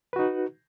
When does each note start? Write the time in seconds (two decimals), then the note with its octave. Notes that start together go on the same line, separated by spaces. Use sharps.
0.13 B4
0.16 F#4
0.19 D#4